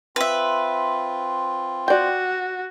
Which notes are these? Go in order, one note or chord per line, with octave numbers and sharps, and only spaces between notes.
C4 F4 B4 E5
F#4 D5 G5